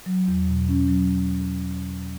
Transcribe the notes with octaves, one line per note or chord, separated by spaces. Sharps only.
F#3
E2
B2
C#4
F#3